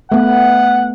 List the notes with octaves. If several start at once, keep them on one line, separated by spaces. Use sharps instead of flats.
A3 B3 F#5